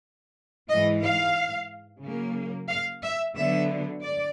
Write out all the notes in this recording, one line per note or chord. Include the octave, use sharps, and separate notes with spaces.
G#2 E3 G#3 D#5
F5
C#3 F#3 A#3
F5
E5
D3 F#3 B3 E5
D5